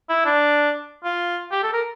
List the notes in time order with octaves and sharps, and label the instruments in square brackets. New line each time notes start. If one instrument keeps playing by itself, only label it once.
[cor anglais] E4
D4
F4
G4
A4
A#4